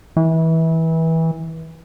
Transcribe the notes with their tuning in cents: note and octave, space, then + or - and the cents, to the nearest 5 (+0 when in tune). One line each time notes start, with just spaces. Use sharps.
E3 -25